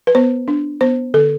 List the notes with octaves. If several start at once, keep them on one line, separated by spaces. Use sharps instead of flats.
B4
B3 C5
D4
B3 C5
D3 A4